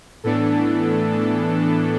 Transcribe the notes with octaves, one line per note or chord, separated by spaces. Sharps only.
A2 E3 B3 D4 A4